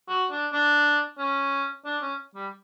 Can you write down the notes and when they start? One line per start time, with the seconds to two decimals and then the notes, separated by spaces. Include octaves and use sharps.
0.09 F#4
0.31 D4
0.52 D4
1.19 C#4
1.85 D4
2.01 C#4
2.35 G3